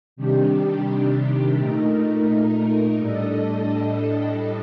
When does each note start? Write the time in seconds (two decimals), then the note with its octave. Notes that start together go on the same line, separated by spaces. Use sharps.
0.16 C3 D#3 G3 D4 G4
1.57 A#2 A3 D#4 A#4
2.97 A2 G3 D4 A4 D#5